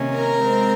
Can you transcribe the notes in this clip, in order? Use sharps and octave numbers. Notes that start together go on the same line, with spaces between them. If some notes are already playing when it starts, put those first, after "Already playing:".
Already playing: C3 D#3 A#3 C#4
A#4 A#5
G#3 C4